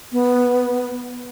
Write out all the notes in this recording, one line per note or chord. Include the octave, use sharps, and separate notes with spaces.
B3